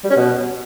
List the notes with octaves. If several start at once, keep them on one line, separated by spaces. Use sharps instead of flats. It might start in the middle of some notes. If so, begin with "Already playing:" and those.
G3
C#4
B2